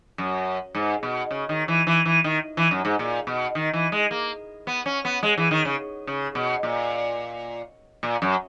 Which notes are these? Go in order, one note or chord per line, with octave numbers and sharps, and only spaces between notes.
F#2
G#2
B2
C#3
D#3
E3
E3
E3
D#3
E3
F#2
G#2
A#2
B2
D#3
E3
G#3
A#3
B3
C#4
B3
G#3
E3
D#3
C#3
C#3
B2
A#2
A#2
F#2